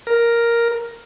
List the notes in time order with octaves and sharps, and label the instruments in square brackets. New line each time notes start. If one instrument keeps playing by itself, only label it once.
[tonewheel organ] A#4